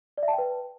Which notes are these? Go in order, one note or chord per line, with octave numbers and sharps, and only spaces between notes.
D5
E5
A5
G5
B4